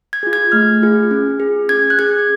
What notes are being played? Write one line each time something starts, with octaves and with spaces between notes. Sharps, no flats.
G#6
F4 G#4
G#6
A3 F6
F4 G#4
C#4
G#4
C#4 G#6
F#6
G#4 G#6